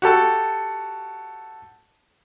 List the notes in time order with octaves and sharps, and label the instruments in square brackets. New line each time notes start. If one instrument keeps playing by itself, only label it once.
[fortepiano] F#4 G4 A4